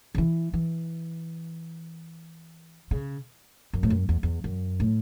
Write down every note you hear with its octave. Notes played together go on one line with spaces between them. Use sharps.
C#3
E3
E3
C#3
F#2
A2
F#2
E2
E2
F#2
A2